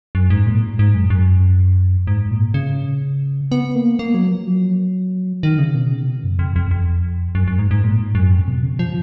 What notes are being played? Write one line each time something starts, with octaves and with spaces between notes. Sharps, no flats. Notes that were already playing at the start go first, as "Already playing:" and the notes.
F#2
G#2
A#2
G#2
G#2
F#2
F#2
G#2
A#2
C#3
B3
A#3
A#3
F#3
F3
F#3
D#3
C#3
B2
C#3
B2
F#2
F2
F2
F2
F#2
F#2
G#2
G#2
A#2
G#2
F#2
F2
B2
C#3
F3